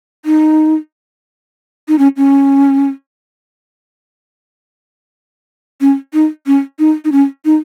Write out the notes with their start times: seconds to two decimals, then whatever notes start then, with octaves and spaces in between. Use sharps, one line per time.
0.25 D#4
1.88 D#4
1.99 C#4
2.17 C#4
5.81 C#4
6.14 D#4
6.46 C#4
6.79 D#4
7.05 D#4
7.12 C#4
7.45 D#4